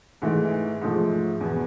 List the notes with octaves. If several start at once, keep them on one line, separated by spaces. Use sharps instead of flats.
G#2 E3 A3
G#2 F3 A3
E2 B2 B3